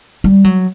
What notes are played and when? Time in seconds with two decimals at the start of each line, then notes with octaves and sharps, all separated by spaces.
0.24 G3
0.44 F#3